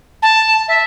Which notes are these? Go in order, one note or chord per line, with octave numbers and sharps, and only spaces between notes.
A5
E5